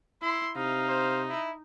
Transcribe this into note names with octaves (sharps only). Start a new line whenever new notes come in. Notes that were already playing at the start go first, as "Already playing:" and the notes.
E4 C6
C3 D#4 F5
C5
E4